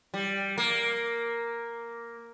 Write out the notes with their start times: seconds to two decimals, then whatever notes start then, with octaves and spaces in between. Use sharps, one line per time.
0.14 G3
0.58 A#3